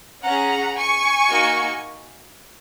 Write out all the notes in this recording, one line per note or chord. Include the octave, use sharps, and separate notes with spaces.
C#4 G#4 F#5 A#5
G#5 C#6
A#3 D#4 F#4